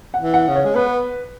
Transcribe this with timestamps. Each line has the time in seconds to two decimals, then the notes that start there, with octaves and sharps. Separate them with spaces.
0.14 F#5
0.21 E3
0.34 F#5
0.48 C#3
0.55 C#5
0.65 G#3
0.75 B3 B4